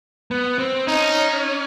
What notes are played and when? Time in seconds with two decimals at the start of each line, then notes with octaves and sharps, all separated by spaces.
0.31 B3
0.59 C4
0.87 C#4 D#4